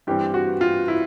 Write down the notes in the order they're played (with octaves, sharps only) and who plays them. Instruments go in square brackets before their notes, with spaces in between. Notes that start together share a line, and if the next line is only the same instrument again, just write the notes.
[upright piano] G2 E3 G3 C4 G4
F#4
F4
E4